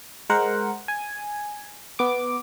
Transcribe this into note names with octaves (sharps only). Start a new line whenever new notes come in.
G#3 A#4 C5 F#5
G#5
B3 D6